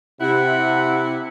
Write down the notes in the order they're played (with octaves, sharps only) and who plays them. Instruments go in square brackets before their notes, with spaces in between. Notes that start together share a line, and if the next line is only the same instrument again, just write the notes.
[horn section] C3 E4 [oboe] F#5